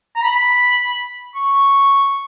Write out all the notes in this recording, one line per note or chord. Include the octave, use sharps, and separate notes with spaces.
A#5
B5
C#6